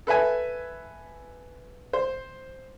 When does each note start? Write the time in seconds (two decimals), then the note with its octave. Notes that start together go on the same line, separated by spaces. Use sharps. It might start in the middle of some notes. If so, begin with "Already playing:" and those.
0.07 A4 B4 E5 G#5
1.93 C5